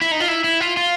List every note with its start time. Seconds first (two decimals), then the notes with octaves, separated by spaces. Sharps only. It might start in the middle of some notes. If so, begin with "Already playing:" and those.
0.01 E4
0.11 D#4
0.20 F4
0.28 E4
0.44 E4
0.60 F4
0.77 F4